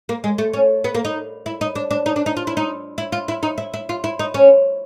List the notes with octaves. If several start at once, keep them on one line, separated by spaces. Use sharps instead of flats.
A#3
G#3
A3
C#4
B3
A#3
D#4
E4
D#4
D4
D4
D#4
D4
D#4
F4
E4
D#4
E4
F4
E4
D#4
E4
E4
F4
E4
D#4
C#4